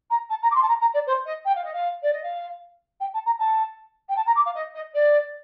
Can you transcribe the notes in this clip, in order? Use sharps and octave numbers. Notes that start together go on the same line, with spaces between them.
A#5
A5
A#5
D6
C6
A5
A#5
A#5
D5
C5
D#5
G5
F5
D#5
F5
D5
D#5
F5
G5
A5
A#5
A5
G5
A5
A#5
D6
F5
D#5
D#5
D5